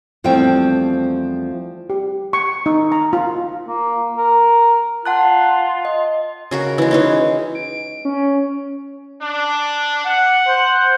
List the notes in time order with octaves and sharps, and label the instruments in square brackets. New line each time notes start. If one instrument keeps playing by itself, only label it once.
[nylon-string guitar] E2 F3 G3 A3 C4 G5
[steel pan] G4
C#6
D#4
A#5
F4
[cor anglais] A#3
A#4
[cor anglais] F4 [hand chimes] F#5 A5 F#6
[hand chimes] D#5
[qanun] C#3 F#4 A#4
E3 G#3
E3 C#4 D#4
[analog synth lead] D7
C#4
[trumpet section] D4
F#5
[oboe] C5